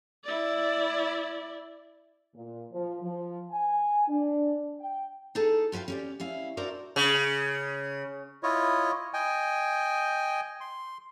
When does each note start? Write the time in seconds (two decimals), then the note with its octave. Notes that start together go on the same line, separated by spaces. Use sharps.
0.24 E4 D5
2.35 A#2
2.72 F3
3.02 F3
3.51 G#5
4.07 D4
4.79 G5
5.35 D#4 G#4 A4
5.72 F4 F#4 B4 F5 G5
5.88 C#4 G4 D5
6.20 C#4 E4 F5
6.57 D4 F#4 A#4 C5 D5 E5
6.96 C#3
8.43 E4 F4 C#5 D#5
9.14 D#5 G5 G#5
10.61 C6